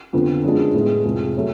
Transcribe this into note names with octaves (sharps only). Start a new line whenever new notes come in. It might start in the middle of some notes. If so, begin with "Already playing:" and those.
F2 D3 F3 B3
F#2 F3 G#3 B3 D4
A2 G#3 B3
F1 F2 F3 G#3
F#3 A3